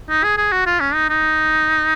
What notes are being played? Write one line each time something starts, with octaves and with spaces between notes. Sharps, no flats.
D#4
G#4
G#4
F#4
F4
C#4
D#4
D#4